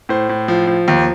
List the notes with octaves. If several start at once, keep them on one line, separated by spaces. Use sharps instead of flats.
A2 C5
A2
F3
F3
D#2